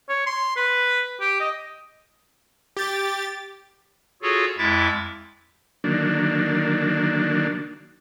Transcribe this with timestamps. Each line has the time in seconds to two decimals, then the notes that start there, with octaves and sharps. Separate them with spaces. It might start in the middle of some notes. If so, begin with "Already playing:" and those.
0.09 C#5
0.27 C6
0.57 B4
1.21 G4
1.40 D#5
2.77 G4 A6
4.22 F4 F#4 G#4 A4 C#5
4.58 F2 G#3 E4 E5 D6 A6
5.84 D3 D#3 F#3 A#3 D4